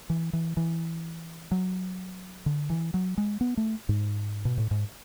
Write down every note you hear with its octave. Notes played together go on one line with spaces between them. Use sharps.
E3
E3
E3
F#3
D3
E3
F#3
G#3
B3
A3
G#2
B2
A2
G#2